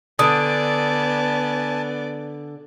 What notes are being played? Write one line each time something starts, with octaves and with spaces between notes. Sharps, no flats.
D3 B3 D5 G#5 A5 D#6